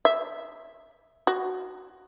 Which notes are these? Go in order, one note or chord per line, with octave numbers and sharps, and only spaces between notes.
E5
F#4